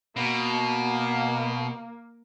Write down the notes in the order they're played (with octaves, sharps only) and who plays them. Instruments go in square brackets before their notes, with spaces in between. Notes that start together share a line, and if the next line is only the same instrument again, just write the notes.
[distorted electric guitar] B2 [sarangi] A#3